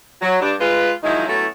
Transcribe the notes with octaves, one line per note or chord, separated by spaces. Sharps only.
F#3
G2 D4
G#3 F4 B4
D#3 F3 F#3 G#3 D#4 E4
F#3 A3 B3 C#4 E4